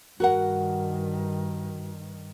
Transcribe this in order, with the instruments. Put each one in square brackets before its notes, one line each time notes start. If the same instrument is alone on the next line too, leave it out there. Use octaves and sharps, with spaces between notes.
[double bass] G2 D#3 [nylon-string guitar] F#4 A#4 F#5